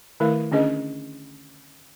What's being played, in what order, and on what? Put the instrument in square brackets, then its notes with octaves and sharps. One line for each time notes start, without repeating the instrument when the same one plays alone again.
[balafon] D#3 A3 E4 A#4 F5
D3 C#4 D4 G#4 D#5